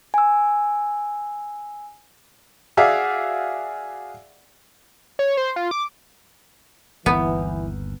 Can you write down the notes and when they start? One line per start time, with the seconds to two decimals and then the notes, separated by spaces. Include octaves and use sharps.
0.14 G#5 E6
2.77 F#4 G#4 D5 E5 F5
5.19 C#5
5.37 C5
5.56 F4
5.71 D6
7.06 G1 D#2 E3 B3